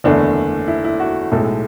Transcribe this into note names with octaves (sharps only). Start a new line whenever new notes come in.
F#1 E2 D3 A3 D4
E4
E4
F#4
B1 A2 G#3 A4